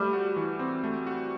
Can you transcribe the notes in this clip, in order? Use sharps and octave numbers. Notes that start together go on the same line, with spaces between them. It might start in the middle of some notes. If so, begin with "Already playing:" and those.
Already playing: G3 A3
F#4
E3
C4
A3
F#4